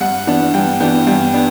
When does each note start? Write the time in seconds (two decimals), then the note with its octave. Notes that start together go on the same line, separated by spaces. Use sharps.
0.01 G2 F#5
0.27 E3 B3 D4
0.54 G2 G5
0.80 E3 B3 D4 G5
1.07 G2 G5
1.34 B3 D4